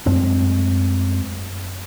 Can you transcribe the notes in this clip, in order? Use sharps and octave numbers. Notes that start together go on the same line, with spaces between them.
F#2 G#3 A3 C4